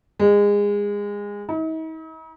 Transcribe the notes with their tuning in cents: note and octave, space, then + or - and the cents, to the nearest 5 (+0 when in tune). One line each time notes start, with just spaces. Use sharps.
G#3 -25
D#4 +45